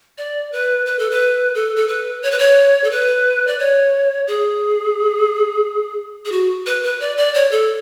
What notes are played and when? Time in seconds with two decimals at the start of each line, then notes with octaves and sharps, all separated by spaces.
0.18 D5
0.52 B4
0.86 B4
0.99 A4
1.11 B4
1.55 A4
1.76 A4
1.88 B4
2.22 C#5
2.31 B4
2.39 C#5
2.84 A4
2.91 B4
3.47 D5
3.59 C#5
4.27 G#4
6.25 G#4
6.32 F#4
6.66 B4
6.83 B4
7.00 D5
7.17 D5
7.34 C#5
7.51 A4